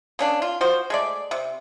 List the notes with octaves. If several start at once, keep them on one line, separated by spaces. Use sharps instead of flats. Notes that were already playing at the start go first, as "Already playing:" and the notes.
A#3 C#4 D4
F4
F3 F#4 C5
G#3 A3 D5
C3